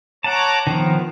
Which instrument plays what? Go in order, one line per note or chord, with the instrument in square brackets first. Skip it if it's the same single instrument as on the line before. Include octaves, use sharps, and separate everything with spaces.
[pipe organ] C#5 A#5 D6 [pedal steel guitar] F#5 A5
[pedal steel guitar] D#3 F3 [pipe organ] B3